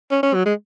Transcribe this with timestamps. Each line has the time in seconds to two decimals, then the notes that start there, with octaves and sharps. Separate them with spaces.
0.11 C#4
0.23 C#4
0.34 F#3
0.46 G#3